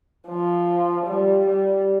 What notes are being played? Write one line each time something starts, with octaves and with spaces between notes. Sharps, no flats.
F3
G3
G3